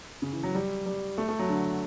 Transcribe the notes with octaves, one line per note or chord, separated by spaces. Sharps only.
C#3
E3
F#3
G3
G3
A3
A3
F#3
D3